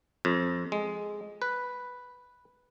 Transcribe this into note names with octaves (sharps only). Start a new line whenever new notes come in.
F2
G#3
B4